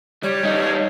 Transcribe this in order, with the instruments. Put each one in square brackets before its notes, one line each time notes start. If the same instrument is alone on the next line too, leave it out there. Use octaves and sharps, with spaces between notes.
[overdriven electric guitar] G3 [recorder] C#5
[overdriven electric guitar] G3 D#4